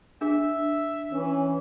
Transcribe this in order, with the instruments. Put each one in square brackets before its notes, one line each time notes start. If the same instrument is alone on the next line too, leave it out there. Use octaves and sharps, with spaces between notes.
[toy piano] D4 G#4 [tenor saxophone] E5
[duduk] E3 [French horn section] C#4